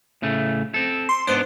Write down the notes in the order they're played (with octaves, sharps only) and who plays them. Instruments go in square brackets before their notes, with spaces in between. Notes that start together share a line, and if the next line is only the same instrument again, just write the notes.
[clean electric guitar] A2 C#3 A3
C4 A4
[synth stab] C6
[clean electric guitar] G#2 B3 D4 [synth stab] C5